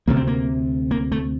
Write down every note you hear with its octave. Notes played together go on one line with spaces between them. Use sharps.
D2 C3 A#3
C4
A#3
A#3
A3